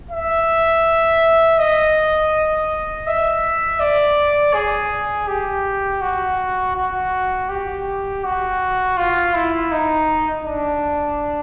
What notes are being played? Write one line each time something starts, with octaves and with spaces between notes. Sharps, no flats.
E5
D#5
E5
D5
G#4
G4
F#4
F#4
G4
F#4
F4
E4
D#4
D4